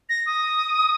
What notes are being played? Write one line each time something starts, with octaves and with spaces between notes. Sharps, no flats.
A#6
D#6